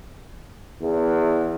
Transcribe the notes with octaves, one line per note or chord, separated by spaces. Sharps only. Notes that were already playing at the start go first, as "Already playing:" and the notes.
E2